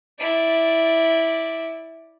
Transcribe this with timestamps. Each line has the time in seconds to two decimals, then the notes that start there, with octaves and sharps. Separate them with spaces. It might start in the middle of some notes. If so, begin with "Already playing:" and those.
0.19 E4 D5